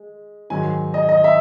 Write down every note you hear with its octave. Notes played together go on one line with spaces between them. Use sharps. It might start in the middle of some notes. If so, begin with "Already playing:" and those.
Already playing: G#3
G#2 D#3 F#3 G#5
D#5
D#5
E5